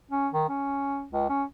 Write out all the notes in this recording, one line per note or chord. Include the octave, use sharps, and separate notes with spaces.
C#4
D#3
C#4
C#2
C#4